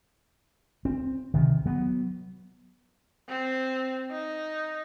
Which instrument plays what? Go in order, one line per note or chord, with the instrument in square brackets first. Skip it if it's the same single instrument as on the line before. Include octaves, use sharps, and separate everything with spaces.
[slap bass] C4
C3 D#3
F#3 B3
[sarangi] C4
D#4